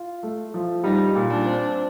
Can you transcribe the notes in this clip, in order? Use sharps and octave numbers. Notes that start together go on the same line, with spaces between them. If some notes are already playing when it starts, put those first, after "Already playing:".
Already playing: F4
A3
F3
G3 D#4
A#2
D4
C4